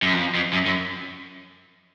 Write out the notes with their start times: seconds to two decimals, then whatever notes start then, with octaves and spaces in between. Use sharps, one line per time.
0.02 F#2
0.13 F2
0.35 F2
0.53 F#2
0.66 F#2